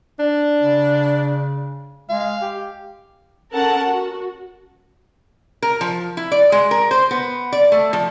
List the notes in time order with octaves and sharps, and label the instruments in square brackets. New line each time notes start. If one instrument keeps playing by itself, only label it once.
[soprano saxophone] D4
[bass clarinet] C#3
[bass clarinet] G#3 [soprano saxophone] F5
[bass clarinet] G4
[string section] C#4 A4 A#4 F#5 A5
F#4
[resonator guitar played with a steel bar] A#4
F3
E4
D5
G#3
A#4
C5
B3
D5
A3
F3